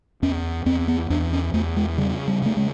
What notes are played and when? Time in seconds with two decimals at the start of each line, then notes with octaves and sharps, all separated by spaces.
0.22 E2 C#4
0.66 E2 C4
0.88 B3
1.10 E2 D4
1.33 C#4
1.54 E2 A3
1.76 G#3
1.98 C#3 G3
2.28 G3
2.42 C#3 A3
2.57 G#3